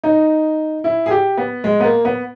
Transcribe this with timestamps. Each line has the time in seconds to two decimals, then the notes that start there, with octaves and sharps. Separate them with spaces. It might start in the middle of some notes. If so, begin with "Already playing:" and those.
0.03 D#4
0.84 E4
1.06 G#4
1.11 G4
1.37 B3
1.64 G#3
1.80 B3
1.84 A#3
2.05 B3